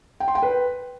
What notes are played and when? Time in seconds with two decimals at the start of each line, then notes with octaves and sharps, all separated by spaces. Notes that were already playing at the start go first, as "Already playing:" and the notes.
0.20 G5
0.28 C6
0.35 G5
0.43 B4